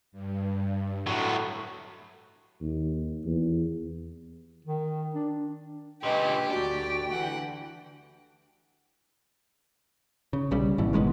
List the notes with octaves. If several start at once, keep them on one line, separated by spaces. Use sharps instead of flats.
G2
A2 F#3 E5 D#6
D#2
E2
D#3
D4
C#2 A#2 D4 G4 B4 D#5
D2 F#4 D5 G5
D3 E3 F#5
C#3
B1 C#3 G3
G#1 B2 E3
D#3 G#3 A#3 B3